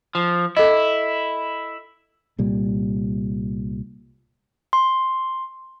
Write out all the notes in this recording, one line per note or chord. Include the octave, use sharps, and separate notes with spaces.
F3
E4 A4 D#5
C2 A#2 G3
C6